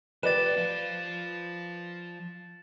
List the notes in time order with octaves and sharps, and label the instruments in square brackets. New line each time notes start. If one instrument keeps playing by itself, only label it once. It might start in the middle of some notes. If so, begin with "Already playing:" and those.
[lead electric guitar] F3 G4 [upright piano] B4 D5 [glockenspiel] A6 E7
[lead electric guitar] F3 F4